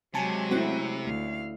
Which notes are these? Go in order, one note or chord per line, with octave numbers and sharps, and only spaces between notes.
C3 F#3 G#3 G#5 A5
A3 C4 C#4 E4 F#4 F#6
D2 F5